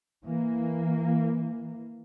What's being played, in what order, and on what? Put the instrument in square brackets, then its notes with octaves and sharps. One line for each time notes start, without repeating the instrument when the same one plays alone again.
[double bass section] E3 A#3